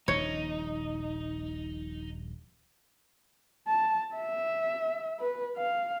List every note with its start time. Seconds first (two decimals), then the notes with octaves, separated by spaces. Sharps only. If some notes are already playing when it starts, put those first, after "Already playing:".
0.08 D#1 A#1 D#4 C#5
3.67 A5
4.15 E5
5.20 B4
5.57 F5